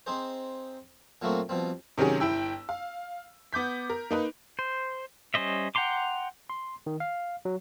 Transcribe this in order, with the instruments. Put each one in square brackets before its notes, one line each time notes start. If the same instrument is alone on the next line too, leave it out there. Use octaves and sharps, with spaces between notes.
[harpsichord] C4 D#4 G#4 C5
A#2 F#3 A3 A#3 C4 F#4
B2 F3 G3 C4
[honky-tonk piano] C3 D#3 F#3 C#4 G#4
G1 E4 G5 E6
F5
B3 D6 G6 B6
A#4
A#3 D#4 B4
[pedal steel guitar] C5
G3 C#4 C5 D#5 E5
F#5 G5 A#5 C6 D6
[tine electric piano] C6
D#3
F5
F#3